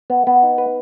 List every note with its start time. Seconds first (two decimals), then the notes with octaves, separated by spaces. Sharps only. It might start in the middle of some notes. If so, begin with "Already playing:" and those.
0.10 B3
0.27 B3
0.43 D#4
0.58 B4